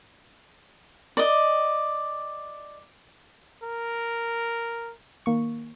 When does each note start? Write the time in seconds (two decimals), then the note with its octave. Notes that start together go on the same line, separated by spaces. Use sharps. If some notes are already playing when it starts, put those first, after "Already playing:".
1.17 D5 D#5
3.63 A#4
5.26 D#3 A#3 C#6